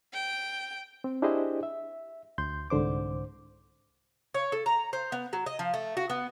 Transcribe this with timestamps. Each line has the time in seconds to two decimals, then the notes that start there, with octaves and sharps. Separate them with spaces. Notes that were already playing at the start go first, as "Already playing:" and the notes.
0.13 G5
1.04 C4
1.22 D4 E4 G4 G#4 C5 D#5
1.63 E5
2.38 D2 C6 G6
2.70 C2 G#2 D3 C5 D6
4.34 C#5
4.52 A4
4.66 A#5
4.93 C5
5.12 B3
5.33 F#3
5.46 D#5
5.59 F3
5.74 A3
5.97 F#4
6.10 B3